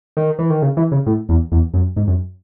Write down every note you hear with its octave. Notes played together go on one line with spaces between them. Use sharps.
D#3
E3
D#3
C#3
E3
C#3
A2
E2
E2
F#2
G#2
F#2